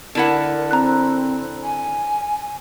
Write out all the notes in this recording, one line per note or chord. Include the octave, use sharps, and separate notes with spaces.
D3 E4 A#4 F#5
C4 A#5 F#6
G#5